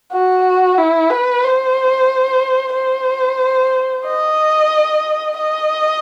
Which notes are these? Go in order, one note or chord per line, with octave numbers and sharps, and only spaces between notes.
F#4
E4
B4
C5
C5
D#5
D#5